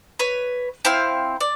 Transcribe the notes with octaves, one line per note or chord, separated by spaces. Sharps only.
B4 C#5
C4 E4 F5 C6
D5